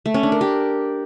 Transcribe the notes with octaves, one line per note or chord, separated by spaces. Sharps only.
A3
C#4
D4
A#4
G4